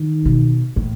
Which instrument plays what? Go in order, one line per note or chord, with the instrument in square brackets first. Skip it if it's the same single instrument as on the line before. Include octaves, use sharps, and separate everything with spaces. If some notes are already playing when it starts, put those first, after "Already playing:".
Already playing: [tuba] D#3
[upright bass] B2
A2